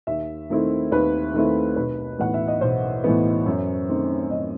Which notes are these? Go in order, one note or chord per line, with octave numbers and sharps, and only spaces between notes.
D#2 E5
D#3 A3 C4 E4
D#2 B4
D#3 A3 C4 E4
B1 B4
A2 E3 B3 F#5
E5
D#5
B1 C5
A2 E3 B3
F#2
D#3 A3 C4 D#4
F#2 D#5